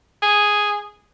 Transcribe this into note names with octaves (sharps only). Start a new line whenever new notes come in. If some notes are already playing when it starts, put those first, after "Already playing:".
G#4